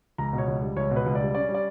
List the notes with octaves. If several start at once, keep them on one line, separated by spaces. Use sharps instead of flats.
C#2 A#5
B2
C#5
C#2
G3
C#2 C#5
B2
B4
C#2
D5
G3
C#4 D5
G3
D5